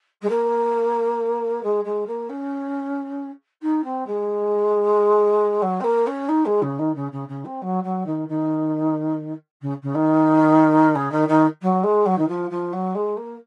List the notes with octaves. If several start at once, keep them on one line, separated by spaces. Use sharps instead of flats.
G#3
A#3
G#3
G#3
A#3
C#4
D#4
C4
G#3
F#3
C4
A#3
C#4
D#4
G#3
C#3
D#3
C#3
C#3
C#3
C4
F#3
F#3
D#3
D#3
C#3
C#3
D#3
C#3
D#3
D#3
F#3
G#3
F#3
D#3
F3
F3
F#3
G#3
A#3